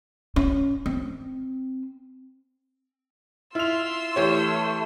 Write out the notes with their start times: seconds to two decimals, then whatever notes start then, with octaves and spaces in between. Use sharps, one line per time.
0.36 C#4
0.86 C4
3.55 E4 F4 C6 E6 F7
4.16 E3 A3 G4 C#5